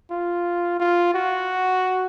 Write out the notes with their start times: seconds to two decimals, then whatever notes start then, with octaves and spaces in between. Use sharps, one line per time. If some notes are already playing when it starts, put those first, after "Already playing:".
0.11 F4
0.80 F4
1.14 F#4